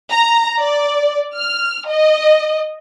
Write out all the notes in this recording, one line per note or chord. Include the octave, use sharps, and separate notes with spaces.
A#5
D5
F6
D#5